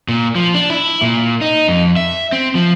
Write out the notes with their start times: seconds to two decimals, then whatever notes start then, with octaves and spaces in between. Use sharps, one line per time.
0.08 A#2
0.35 F3
0.54 D4
0.70 E4
1.02 A#2
1.41 D#4
1.68 F2
1.97 E5
2.32 C4
2.55 F3